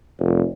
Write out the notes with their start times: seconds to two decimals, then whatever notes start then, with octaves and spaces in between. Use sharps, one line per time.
0.20 F1